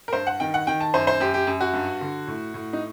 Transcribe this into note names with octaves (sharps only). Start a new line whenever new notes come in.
A#4
G2 C5
F#5
D#3 G5
F#5
D#3 G5
A5
F#2 C5
C5
F#2 G4
G4
F#2
F#4
G2
D3
A2
A2
D#4